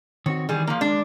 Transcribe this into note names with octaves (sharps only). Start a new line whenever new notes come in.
D#3 C4 F#4 C#5
D#3 E3 G3 G#4
F3 A#3
G#3 D4